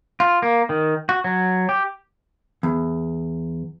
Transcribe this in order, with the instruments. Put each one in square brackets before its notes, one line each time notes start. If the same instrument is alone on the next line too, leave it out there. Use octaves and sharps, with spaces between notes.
[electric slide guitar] F4
A#3
D#3
F#4
F#3
G4
[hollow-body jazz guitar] E2